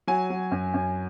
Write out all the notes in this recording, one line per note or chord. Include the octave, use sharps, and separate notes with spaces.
F#3 G#5
F#3
F#2
F#2